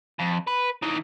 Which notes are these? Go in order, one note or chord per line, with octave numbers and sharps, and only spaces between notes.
F2
B4
D#3 E3